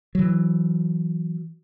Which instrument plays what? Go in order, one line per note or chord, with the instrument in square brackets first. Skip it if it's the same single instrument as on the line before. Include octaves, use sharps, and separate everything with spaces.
[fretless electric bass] E3 F#3